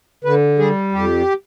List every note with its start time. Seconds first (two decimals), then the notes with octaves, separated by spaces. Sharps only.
0.24 D3 B4
0.58 G3 G#4
0.92 F2 G4